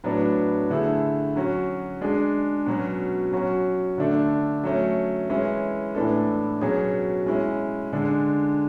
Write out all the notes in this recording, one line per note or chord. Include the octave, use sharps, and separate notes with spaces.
A2 F#3 B3 D4
D3 A3 E4 G#4
F#3 C#4 F#4
G#3 D4 G#4
B2 F#3 C#4
F#3 C#4 F#4
D3 A3 D4 A4
F#3 A3 C#4
E3 G#3 C#4 E4
A2 E3 B3 D4 A4
B2 F#3 C#4 G#4
G#3 C#4 E4
D3 G#3 D4